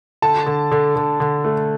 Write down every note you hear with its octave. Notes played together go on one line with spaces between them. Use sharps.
D3 A5
D3
D3
D3
D3
A3